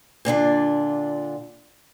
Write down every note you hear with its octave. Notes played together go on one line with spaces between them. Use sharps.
A#2 D3 D4 F4